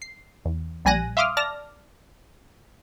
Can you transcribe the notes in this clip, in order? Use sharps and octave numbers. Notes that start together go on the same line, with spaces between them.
C7
E2
A#1 G3 G#5 F#6 A#6 D#7
E5 F5 C6 D6 D#6 F6
D5 A5 F6 A#6